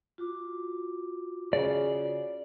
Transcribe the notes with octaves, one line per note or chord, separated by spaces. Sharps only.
F4 F#4 D6
C#3 D5